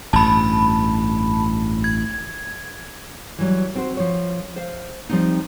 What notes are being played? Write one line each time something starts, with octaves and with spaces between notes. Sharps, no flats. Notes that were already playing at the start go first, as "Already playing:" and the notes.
A1 G2 A5 B5
G#6
E3 F#3 G3
C4 F#4 C5
F3 C#5
C5 F5
F3 G3 A#3 C4 D#4